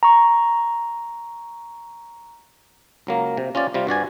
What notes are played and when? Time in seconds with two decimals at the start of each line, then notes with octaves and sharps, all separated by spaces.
0.03 A#5 C#6
3.07 C#2 F#3 A#3
3.37 C3
3.55 C#4 F4 G4 D5
3.74 C3 G3 F4
3.87 G2 F#4 D5 G#5